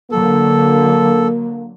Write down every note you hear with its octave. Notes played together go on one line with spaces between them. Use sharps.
D3 F#3 A#3 A4